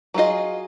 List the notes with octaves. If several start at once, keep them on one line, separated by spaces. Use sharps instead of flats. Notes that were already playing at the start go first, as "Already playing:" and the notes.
F#3 B3 F4 G#4 D#5